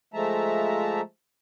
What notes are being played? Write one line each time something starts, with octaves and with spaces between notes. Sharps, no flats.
F3 G#3 A3 E5 A5 A#5